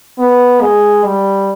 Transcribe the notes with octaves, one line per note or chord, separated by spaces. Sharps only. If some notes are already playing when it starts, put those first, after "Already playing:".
B3
G#3
G3